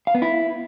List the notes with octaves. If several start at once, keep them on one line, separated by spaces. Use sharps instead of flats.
F5
B3
E4